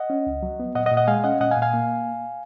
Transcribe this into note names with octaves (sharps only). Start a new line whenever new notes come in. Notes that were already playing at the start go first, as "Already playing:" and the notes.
Already playing: D#5 F#5
C#4
C#2
F#3
B3
A#2 D#5 F#5
D#5 F#5
A#2
D#5 F#5
G#3 F5 G#5
C#4 D#5 F#5
A#2 D#5 F#5
F5 G#5
A#2
F5 G#5
A#3